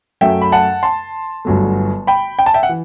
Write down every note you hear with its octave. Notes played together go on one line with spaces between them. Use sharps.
F#2 F#3 A3 E5 G5
B5
F#5 A5
A5 C6
G1 G2 F#3 A3
G5 B5
G5
A5
E5 G5
F#5
E3